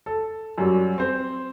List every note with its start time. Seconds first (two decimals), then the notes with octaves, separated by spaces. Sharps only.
0.06 A4
0.58 F#2 F#3 G3 F#4
0.98 C4 C5